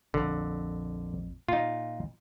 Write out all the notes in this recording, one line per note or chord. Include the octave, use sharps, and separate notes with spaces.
A#1 F2 D3
A#2 D#4 F4